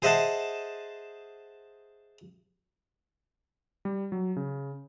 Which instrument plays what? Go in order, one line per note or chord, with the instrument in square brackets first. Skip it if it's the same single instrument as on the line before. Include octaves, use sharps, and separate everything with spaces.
[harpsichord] G#4 C5 D#5 E5 F#5 A5
[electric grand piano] G3
F#3
C#3